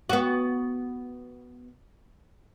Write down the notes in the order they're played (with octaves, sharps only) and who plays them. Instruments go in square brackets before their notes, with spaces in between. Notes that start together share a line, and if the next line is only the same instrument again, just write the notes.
[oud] B3 F#4